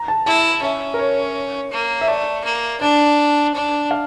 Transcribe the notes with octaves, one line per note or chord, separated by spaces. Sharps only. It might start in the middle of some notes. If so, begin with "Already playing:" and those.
Already playing: A#5
A5
E4 A5
C#4 E5
A#4
C#5
A#3
E5
A3 D5
A#3
D4 D5
D4
F5